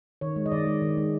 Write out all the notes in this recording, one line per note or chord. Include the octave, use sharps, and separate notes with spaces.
D#3 C#5
G#3
D#5
D#3 D5
G#3
D#3
G#3